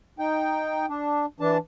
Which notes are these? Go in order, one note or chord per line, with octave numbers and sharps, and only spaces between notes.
D#4 G5
D4
E3 D4 A5